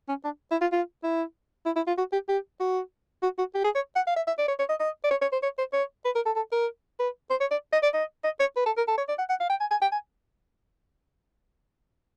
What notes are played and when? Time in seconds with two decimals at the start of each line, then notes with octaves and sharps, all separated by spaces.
0.09 C#4
0.24 D4
0.52 E4
0.61 F4
0.72 F4
1.04 E4
1.66 E4
1.76 E4
1.87 F4
1.98 F#4
2.13 G4
2.29 G4
2.60 F#4
3.23 F#4
3.39 F#4
3.55 G4
3.65 G#4
3.75 C#5
3.96 F#5
4.07 F5
4.16 E5
4.27 E5
4.38 D5
4.48 C#5
4.59 C#5
4.69 D#5
4.80 D#5
5.04 D5
5.11 C#5
5.22 C#5
5.33 C5
5.43 C#5
5.58 C5
5.73 C#5
6.05 B4
6.15 A#4
6.26 A4
6.36 A4
6.52 A#4
6.99 B4
7.31 C5
7.41 C#5
7.51 D5
7.73 D#5
7.83 D5
7.94 D#5
8.24 D#5
8.40 C#5
8.57 B4
8.66 A4
8.77 A#4
8.88 A4
8.98 C#5
9.09 D5
9.19 F#5
9.30 F#5
9.40 F5
9.50 G5
9.61 G#5
9.71 G#5
9.82 G5
9.92 G#5